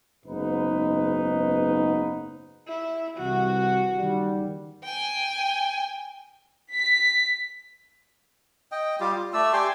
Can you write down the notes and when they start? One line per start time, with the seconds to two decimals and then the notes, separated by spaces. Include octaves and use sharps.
0.25 F#1 G#2 B3 D#4 B4
2.68 E4
3.18 C2 E3 F#4
3.96 F#1 D#3 G3
4.84 G5 G#5
6.74 B6
8.72 D#5 G5
9.00 G3 F4 G4
9.15 F4
9.33 A3 D5 E6
9.53 G4 G5 G#5 C6